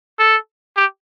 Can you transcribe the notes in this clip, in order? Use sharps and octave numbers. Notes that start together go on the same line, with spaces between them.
A4
G4